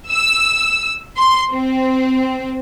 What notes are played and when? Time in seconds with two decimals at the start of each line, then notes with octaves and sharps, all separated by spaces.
0.11 E6
1.18 C6
1.53 C4